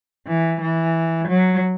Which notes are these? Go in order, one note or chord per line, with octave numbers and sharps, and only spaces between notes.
E3
E3
F#3